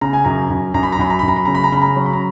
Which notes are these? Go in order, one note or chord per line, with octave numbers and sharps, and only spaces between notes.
C#3 A#5
G#5
F#2 A#5
F#2
F#2 A#5
B5
A#5
F#2 B5
A#5
F#2 B5
A#5
B5
C#3 A#5
B5
A#5
C#3 B5
A#5
F#3
B5
A#5